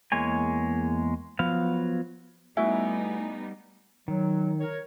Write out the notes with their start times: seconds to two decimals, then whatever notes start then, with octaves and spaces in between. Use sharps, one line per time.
0.12 E2 G#3 A#3 C#5 G#5
1.39 F3 F#3 B3 F5
2.57 G3 A3 B3 D#4 E4 F#4 E5 G#5
4.08 D#3 F#3
4.60 A#4 C#5